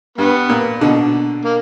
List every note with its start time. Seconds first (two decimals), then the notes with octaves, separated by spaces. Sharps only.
0.18 G2 G3 B3
0.49 A#2
0.81 B2 D3
1.45 A#3